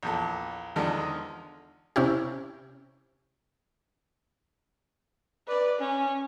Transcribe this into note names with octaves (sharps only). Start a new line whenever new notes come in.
A#1 E2 A4
E2 D3 D#3 F3 G#3 D#4
C3 C#4 E4 G4
B4 D5
C#4